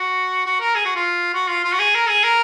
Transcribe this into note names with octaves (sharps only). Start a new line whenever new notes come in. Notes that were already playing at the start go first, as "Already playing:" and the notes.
Already playing: F#4
F#4
A#4
G#4
F#4
F4
F#4
F4
F4
F#4
G#4
A#4
G#4
A#4